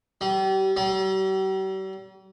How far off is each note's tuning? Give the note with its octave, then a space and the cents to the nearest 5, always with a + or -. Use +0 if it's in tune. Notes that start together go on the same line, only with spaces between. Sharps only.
G3 -35
G3 -45